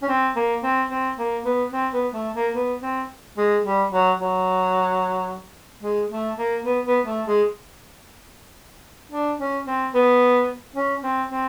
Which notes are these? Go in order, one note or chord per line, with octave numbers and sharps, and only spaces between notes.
C#4
C4
A#3
C4
C4
A#3
B3
C4
B3
A3
A#3
B3
C4
G#3
G3
F#3
F#3
G#3
A3
A#3
B3
B3
A3
G#3
D4
C#4
C4
B3
C#4
C4
C4